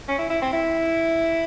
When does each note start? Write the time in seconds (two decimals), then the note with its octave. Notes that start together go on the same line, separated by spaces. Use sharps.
0.08 C#4
0.18 E4
0.30 E4
0.42 C4
0.53 E4